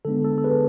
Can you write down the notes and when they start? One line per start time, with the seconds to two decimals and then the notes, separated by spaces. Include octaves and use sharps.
0.05 D3 G#3 B3 D4 A4
0.24 A4
0.38 A4
0.44 G#4 B4